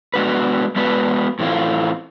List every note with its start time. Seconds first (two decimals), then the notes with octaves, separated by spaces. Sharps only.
0.14 G#3 B3 D4 F#4 B4
0.76 G#3 B3 D4 F#4 B4
1.39 A2 E3 A3 C4 F4